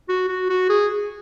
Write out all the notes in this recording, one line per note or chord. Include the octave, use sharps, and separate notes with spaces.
F#4
F#4
F#4
G#4